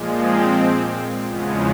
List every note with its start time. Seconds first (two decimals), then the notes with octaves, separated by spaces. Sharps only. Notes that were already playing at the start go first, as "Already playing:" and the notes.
Already playing: A#2 F3 G#3
0.22 C4
1.28 E2 C#3 F3 G#3 B3